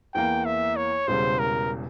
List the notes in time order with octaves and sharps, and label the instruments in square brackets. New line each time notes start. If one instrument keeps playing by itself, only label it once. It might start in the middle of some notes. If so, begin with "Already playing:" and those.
[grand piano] E2 E3 A#3 [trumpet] G5
[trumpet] E5
C#5
[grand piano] E1 E2 C#3 G3 [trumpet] C5
[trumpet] A#4